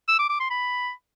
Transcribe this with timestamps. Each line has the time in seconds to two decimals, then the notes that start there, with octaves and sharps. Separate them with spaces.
0.08 E6
0.19 D6
0.29 D6
0.40 C6
0.51 B5